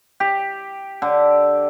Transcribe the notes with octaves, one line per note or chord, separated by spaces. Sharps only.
G4
D3